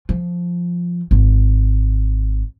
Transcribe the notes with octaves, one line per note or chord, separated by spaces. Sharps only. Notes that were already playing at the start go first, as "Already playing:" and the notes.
F3
G#1